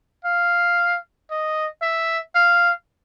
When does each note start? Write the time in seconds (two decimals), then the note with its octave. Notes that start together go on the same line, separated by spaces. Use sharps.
0.25 F5
1.30 D#5
1.82 E5
2.35 F5